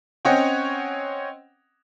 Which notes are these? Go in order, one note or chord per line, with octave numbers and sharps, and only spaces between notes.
C4 C#4 C#5 D#5 F#5 G5